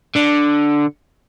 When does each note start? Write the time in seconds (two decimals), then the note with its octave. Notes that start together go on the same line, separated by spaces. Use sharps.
0.15 D3